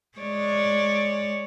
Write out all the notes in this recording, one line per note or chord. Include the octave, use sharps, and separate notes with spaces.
G#3 C#5 D5